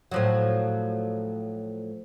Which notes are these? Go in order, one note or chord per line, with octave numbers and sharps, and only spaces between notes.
A2 F3 F#3